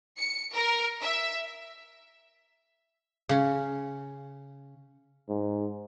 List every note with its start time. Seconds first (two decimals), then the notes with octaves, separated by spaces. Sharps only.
0.17 C#7
0.53 A#4
1.01 E5
3.29 C#3 C#4
5.29 G#2